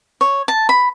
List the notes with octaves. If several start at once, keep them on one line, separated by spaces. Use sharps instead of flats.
C#5
A5
B5